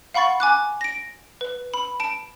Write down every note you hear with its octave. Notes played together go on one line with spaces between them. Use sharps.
F5 F#5 B5 C#6 A6
G#5 D6 F#6
A#6 D7
B4
B5
A5 D7